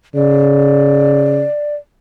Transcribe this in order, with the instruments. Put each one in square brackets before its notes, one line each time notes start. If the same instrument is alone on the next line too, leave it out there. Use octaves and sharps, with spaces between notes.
[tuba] C#3 [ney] D5